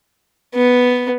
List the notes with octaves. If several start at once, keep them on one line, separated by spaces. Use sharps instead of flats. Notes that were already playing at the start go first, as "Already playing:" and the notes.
B3